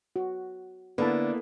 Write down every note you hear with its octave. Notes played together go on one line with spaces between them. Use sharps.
F#4
D3 A#3 B3 E4 B4 A5